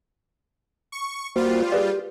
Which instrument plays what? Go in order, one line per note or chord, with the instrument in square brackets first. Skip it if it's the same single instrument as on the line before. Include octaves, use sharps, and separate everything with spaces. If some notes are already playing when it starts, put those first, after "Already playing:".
[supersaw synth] C#6
[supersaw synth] G3 F4 [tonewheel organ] A#3 F#4 C5
[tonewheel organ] G4 [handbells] G#4 B4 D5